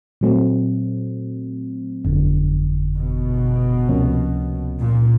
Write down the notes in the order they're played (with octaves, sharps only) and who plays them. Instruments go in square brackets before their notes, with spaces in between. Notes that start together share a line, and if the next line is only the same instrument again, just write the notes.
[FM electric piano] A#2 F#3 A3 C4
G1 F2 D3
[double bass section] B2
[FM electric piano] C#2 C3 F3 A#3 C#4
[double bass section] A#2